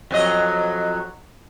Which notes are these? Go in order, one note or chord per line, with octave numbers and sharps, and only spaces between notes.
F2 F#3 D#5